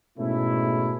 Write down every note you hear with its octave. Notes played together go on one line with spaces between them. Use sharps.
G#2 B2 A3 C#4 E4